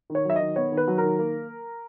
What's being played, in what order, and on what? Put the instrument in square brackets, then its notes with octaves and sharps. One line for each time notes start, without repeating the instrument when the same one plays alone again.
[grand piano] D#3
C#5
F#3 E5
D#3 D#5
B3 C#5
D#3
B4
F#3
A#4
D#3
A#3